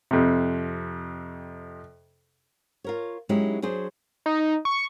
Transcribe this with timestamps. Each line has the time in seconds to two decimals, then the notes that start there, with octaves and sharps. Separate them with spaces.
0.11 F2 C3
2.84 F4 A#4 C#5
3.29 F#3 G#3 C#4 D#4 E4 G4
3.62 F#3 D4 G#4 C5
4.26 D#4
4.65 C#6